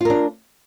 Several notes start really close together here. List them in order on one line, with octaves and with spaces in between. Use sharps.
F4 A#4 D4